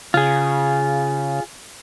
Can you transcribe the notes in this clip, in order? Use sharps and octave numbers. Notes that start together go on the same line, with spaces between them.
C#3 F4 G#4